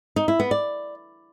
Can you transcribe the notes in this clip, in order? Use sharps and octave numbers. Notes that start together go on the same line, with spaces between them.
D#4
E4
B3
D5